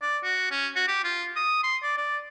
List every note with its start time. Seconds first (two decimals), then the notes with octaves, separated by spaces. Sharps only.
0.02 D5
0.24 F#4
0.51 C#4
0.76 F#4
0.88 G4
1.04 F4
1.36 D#6
1.63 C6
1.83 D5
1.97 D5